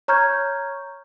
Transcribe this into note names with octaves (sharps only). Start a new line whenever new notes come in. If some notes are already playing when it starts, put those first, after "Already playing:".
C#5 A#5 C#6 F6 G6 G#6